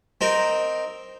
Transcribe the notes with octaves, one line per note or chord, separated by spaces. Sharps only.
C4 D#4 A#4